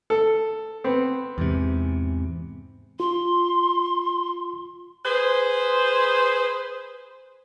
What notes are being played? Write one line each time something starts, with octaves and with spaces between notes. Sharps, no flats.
A4
B3 C4
E2 G#2 C3
F4 C6
G#4 B4 C5